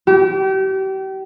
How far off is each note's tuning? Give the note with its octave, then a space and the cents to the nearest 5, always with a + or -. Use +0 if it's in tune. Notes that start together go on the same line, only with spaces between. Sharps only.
G4 -35